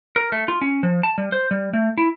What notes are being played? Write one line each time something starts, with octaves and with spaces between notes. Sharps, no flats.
A#4
A3
F4
C#4
F3
A5
G3
C5
G3
A3
E4